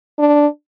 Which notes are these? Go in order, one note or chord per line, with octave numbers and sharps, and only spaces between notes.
D4